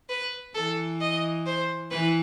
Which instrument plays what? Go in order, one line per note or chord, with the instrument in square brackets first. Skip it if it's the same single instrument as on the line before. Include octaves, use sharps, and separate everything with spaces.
[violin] B4
[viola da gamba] E3 [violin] A4
[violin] D#5
C5
[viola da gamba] E3 [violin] B4